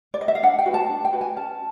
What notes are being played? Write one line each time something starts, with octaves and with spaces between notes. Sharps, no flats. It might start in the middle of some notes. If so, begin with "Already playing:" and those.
D5
D#5
E5
F5
D4 F#5
G5
F#4 B4
A5
D4
G5
F#4 B4
G#5
C#4 A5